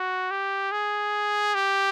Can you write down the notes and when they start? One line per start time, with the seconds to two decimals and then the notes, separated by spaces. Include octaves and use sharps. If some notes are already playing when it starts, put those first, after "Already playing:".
Already playing: F#4
0.31 G4
0.71 G#4
1.54 G4